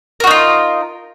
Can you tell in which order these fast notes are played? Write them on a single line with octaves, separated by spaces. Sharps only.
A#4 F#4 D#4 F4